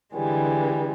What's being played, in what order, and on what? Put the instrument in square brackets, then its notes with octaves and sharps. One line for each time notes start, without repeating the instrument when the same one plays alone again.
[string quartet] D3 E3 G3 G#3